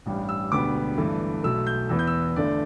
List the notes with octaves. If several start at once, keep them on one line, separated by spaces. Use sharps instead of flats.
A1 G2 G3
E6
E1 D2 D3 G3 B3 D6
G1 G2 E3 A3
B1 B2 A3 E6
G6
E2 E3 B3 E4 E6
G6
E6
G1 G2 D3 A3 D5